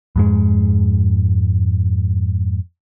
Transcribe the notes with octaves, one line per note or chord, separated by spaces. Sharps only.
F2 G#2 G#3